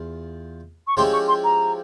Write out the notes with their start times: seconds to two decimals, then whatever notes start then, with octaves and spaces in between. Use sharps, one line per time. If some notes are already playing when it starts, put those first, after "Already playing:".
Already playing: E2 F4
0.87 C#6
0.97 F3 G#3 C#4 E4 G4 C6
1.12 C#6
1.28 C6
1.44 A#5